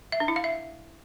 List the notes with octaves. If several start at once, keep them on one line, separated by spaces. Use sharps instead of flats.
E5
D4
E4
F5
E5